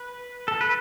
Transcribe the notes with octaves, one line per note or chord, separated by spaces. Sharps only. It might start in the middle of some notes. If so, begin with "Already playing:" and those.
Already playing: B4
A4
B4